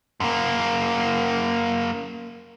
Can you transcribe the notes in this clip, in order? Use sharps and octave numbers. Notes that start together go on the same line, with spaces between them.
F#2 A#3